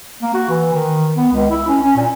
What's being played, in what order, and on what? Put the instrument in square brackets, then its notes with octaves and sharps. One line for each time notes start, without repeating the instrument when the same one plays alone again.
[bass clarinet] A#3
F#4
E3
D#3
B3
C#2
E4
C#4
C#4
A#2